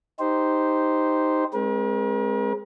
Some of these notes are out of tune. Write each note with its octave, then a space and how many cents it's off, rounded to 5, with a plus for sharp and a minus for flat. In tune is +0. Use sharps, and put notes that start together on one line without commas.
D#4 +0 G4 +0 C5 -5
G#3 +0 C4 +25 A#4 +45